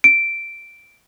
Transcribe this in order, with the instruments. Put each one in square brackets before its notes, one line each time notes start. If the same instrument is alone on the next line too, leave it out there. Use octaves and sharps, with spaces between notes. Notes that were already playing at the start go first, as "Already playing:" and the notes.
[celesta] D7